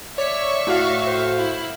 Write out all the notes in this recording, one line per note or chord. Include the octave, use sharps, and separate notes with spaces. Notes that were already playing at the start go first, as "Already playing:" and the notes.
C#5 D5 E5 C#6 B6 C#7
A2 F#4 F5
C5
E4